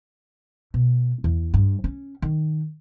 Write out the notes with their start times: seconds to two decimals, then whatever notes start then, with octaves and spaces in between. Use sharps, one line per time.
0.74 B2
1.24 E2
1.54 G2
1.84 C#4
2.22 D#3